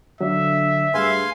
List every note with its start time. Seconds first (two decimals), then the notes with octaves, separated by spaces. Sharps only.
0.21 D3 F#3 D5 E5 F5
0.94 G2 A3 G#4 B4 F5 G#5 C6